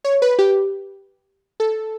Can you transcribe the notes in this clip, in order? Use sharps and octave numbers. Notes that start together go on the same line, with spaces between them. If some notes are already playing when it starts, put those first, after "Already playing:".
C#5
B4
G4
A4